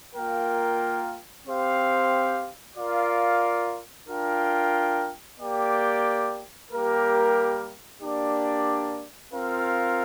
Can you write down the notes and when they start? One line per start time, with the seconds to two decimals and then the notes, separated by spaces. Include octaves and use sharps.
0.14 A#3 F4 A#4 G5
1.45 C4 G4 C5 F5
2.76 F4 A#4 D5 F5
4.07 D4 F4 A#4 G5
5.39 A#3 G4 D5 G5
6.70 G3 A#3 G4 A#4
8.01 A#3 D4 G4 D5
9.32 C4 F4 A#4 F5